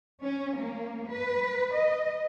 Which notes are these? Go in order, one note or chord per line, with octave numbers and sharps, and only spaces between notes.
C#4
A#3
B4
D#5